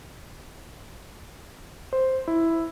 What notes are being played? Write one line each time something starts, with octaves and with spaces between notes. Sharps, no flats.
C5
E4